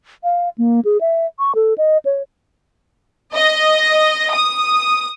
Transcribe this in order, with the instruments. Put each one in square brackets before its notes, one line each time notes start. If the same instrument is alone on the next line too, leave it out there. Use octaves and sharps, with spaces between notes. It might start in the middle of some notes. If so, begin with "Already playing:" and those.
[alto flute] F5
A#3
G#4
E5
C#6
A4
D#5
C#5
[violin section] D#5
D#6